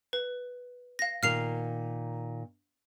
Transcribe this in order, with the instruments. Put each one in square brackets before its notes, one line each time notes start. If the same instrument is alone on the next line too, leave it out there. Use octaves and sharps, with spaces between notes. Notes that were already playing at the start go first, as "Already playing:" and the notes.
[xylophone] B4
F5 A#6
[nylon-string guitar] A#2 D#3 [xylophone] F6 C7 F7